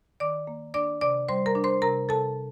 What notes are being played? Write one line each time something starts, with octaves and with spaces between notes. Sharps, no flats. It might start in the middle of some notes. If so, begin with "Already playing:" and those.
D#3 D5 D6
A#3
D4 D5 D6
C3 D5 D6
G3 C5 C6
A#4 A#5
D4
C5 C6
C3 A#4 A#5
C3 A4 A5